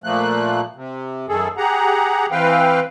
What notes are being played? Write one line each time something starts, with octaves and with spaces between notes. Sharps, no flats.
A#2 F3 A3 A#3 F#6
C3
F#2 D#3 G#4 A4
G4 G#4 F#5 A#5
E3 C4 B4 F5 G5